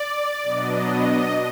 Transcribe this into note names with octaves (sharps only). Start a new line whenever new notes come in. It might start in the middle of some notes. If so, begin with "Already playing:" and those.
Already playing: D5
B2 F#3 B3 D4 D#5